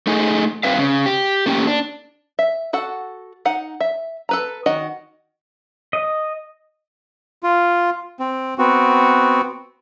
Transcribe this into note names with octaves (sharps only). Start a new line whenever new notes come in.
A3 D#4 G#4
G2 C4 B4 E5 F5
C#3
G4
A3 A#3 C#4 G4 G5
D4
E5
F#4 A4 F#5
D#4 F#5
E5
A4 B4 A#5
D#3 F#4 D#5 F#5
D#5
F4
C4
B3 C4 F#4